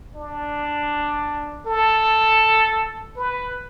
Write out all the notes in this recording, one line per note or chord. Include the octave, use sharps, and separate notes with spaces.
D4
A4
B4